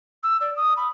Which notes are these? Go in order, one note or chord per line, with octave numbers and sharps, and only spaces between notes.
E6
D5
D#6
B5